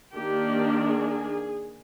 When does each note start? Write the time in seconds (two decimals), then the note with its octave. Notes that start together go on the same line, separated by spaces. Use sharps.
0.16 D#3 A#3 D4 G4
0.85 G#4